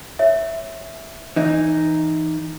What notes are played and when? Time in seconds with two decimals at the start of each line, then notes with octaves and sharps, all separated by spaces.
0.19 C#5 E5
1.36 E3 D#4